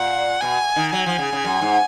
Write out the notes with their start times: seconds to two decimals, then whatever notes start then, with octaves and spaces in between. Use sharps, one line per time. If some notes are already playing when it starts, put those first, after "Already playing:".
Already playing: A#2 F#5
0.41 B2 G#5
0.76 D#3
0.93 F#3 G#5
1.06 F3
1.18 C#3
1.32 C#3
1.45 F#2
1.62 G#2